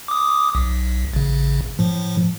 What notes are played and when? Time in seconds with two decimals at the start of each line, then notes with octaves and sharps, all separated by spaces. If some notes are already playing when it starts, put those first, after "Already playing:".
0.08 D6 D#6
0.55 B1
1.14 A1 C#3
1.79 A2 F3